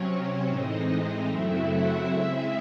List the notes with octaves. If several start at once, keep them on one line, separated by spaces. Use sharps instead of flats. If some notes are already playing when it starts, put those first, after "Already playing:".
Already playing: C3 F#3 C4 C#4 C#5
A2 E3 G#3 C4 D#4 D#5
F#2 C#3 F#3 A3 C4 E4 E5
F#4 F#5
C#3 G#3 C4 E4 E5